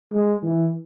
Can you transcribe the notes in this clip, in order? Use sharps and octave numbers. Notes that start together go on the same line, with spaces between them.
G#3
E3